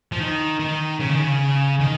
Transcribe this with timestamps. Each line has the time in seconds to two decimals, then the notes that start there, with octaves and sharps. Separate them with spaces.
0.12 F3
0.20 D#3
0.60 D#3
1.00 C#3
1.09 D#3
1.19 C#3
1.80 D#3